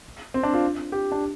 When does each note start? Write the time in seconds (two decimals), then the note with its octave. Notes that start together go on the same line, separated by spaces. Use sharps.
0.34 C4
0.43 D4
0.54 F4
0.92 G4
1.12 D4